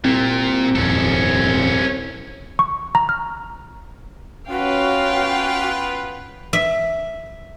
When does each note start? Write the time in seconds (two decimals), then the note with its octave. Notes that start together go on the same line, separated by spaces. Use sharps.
0.05 C2 A#2 C4
0.76 D#1 G#1 F2 C#4 A4
2.59 C#6
2.95 A#5
3.09 F6
4.50 B3 C#4 F4 F#4 B4 F5 G5
6.53 E5